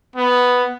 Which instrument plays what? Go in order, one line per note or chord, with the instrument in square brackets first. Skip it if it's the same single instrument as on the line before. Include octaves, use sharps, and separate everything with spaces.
[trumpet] B3